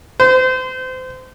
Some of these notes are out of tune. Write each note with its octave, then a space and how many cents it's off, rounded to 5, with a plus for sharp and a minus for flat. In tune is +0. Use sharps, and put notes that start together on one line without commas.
C5 -30